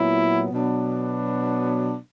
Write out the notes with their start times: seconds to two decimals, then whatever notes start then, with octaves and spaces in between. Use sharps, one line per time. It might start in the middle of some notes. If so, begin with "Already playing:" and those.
Already playing: A#2 F#3 B3 E4
0.51 B2 F#3 B3 D4